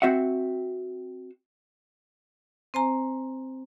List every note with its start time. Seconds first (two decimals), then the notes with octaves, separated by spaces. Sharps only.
0.02 C4 F#4 E5 F#5
2.74 C4 C5 G#5 A#5